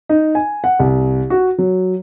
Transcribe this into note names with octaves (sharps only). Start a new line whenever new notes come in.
D#4
G#5
F#5
C2
F#4
F#3